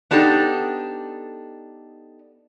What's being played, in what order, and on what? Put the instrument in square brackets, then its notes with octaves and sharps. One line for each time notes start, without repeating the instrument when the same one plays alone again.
[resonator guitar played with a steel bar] B3 D4 D#4 G4 A4